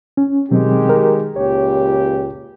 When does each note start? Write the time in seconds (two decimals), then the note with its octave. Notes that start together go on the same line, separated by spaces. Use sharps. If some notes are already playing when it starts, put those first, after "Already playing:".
0.17 C#4
0.51 B2 D#3 F#3 G#3 C4 G4
0.89 A#4
1.36 C#2 A#2 G4 C#5